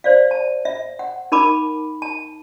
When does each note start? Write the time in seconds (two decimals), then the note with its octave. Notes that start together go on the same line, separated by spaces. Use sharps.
0.04 C5 D5 F5
0.31 A5
0.65 E5
0.99 F#5
1.32 D#4 A#4 A5 B5 D6
2.02 A5